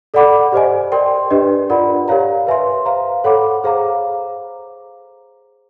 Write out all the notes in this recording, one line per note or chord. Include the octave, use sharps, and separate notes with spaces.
A4 D5 F#5 B5 D6
G4 C5 D#5 G#5
A#4 D5 G5 C6
D4 G4 B4 D#5
F4 A#4 D5 F#5 B5
G4 A#4 C#5 F5 A#5
B4 E5 G#5 C6
C5 F5 A#5
A4 C#5 F#5 B5 D6
G#4 C5 F5 A#5 D6